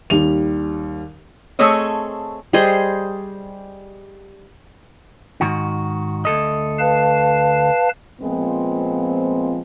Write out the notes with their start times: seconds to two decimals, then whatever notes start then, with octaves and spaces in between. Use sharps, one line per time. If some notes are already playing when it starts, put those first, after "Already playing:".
0.10 D#2 G3 F7
1.59 A3 C4 G#4 A4 C#5 D#5
2.53 G3 G#4 C5 D#5
5.41 G#2 D#3 F#4
6.25 D2 A4 D#5
6.79 B4 F5 A5
8.21 A#2 F3 G#3 B3 C4